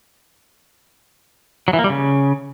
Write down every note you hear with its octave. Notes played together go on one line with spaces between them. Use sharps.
F#3
E3
A#3
G3
C#3